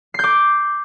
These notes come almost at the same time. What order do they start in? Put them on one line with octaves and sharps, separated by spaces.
C7 G6 D6